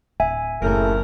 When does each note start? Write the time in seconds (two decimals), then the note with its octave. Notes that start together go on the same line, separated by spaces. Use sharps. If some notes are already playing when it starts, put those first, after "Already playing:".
0.20 D1 E5 G#5
0.62 F#1 F2 A2 C#3 F3 A3 A#4